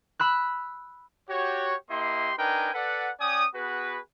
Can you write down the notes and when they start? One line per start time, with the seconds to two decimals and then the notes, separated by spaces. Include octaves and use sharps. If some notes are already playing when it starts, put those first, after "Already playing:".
0.19 B5 E6 F#6
1.30 F#4 G4 C#5
1.90 A#3 E4 G4 D#5 C6
2.39 D4 D#4 A#4 B4 G5 G#5
2.74 A4 B4 D5 F#5
3.20 C#4 D5 G5 G#5 D#6
3.55 B3 F#4 G#4 B4